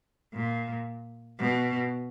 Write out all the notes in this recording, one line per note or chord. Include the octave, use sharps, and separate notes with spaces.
A#2
B2